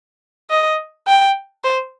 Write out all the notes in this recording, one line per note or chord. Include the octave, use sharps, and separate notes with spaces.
D#5
G5
C5